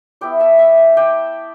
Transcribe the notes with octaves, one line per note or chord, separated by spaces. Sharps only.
G3 B3 E4 D5 G5
E5 A5
E5 A5
D5 G5